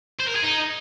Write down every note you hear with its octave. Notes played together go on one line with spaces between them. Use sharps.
C5
A#4
G#4
D#4